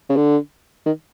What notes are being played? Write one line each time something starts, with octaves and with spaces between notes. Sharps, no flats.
C#3
D3
D#3